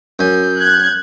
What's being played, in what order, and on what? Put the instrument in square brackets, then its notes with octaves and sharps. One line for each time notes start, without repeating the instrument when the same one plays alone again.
[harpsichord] F#2 G#5 [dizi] G6
[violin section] F#6 G#6